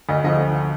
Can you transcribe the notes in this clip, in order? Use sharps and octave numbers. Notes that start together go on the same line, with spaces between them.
D2 D#5
D3 F3 D#5